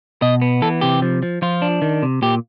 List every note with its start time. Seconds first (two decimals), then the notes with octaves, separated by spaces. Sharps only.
0.22 B2 D#5
0.42 B3
0.62 E3 A4
0.81 C3 G4
1.02 F3
1.23 F3
1.42 F3 F4
1.62 D4
1.82 D#3
2.03 C3
2.22 A#2 G4